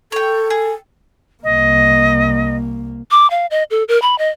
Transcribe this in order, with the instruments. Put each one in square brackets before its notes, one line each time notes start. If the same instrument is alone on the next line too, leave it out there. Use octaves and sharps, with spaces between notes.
[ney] A4 [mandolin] C#5 G5
[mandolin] G#4
[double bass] C2 A#3 [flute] D#5
[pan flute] D6
F5
D#5
A4
A#4
B5
D#5